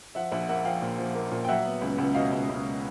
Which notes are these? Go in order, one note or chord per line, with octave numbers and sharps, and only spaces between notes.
F3 E5 F#5
A#1 E5 F#5
A#3 E5 F#5
F3 F5 G5
A#2
F3
A#3
A#2
G5
F#3 E5 F#5
B3
C#2
C#2
B2 D#5 F5
C#2
C#2